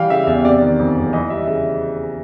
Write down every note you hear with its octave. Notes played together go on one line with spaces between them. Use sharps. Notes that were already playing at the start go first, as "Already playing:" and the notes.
Already playing: E3 G3 F5 G5
C#3 E5
E2 E5
C3 D5
D#3
F2
F#1
E3 D#5
G3 E5
C#3 E5